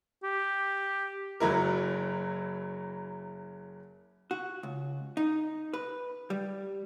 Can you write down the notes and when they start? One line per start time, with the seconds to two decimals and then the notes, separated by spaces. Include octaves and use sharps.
0.23 G4
1.40 F#1 F#3 E4 A#4
4.31 F#4
4.63 C#2
5.17 D#4
5.74 B4
6.30 G3